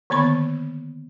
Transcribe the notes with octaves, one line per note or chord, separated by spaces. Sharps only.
D3 D#3 A#3 B3 B5